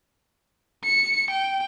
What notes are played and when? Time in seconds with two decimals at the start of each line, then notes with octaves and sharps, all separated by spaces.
0.84 C#7
1.31 G5